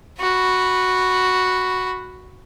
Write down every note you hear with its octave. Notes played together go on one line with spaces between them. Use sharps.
F#4 B5